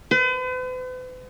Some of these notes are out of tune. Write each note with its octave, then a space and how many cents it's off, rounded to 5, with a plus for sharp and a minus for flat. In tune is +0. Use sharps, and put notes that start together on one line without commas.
B4 +45